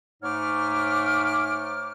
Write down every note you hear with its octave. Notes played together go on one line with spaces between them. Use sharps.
G#2 A3 C#5 D6 F6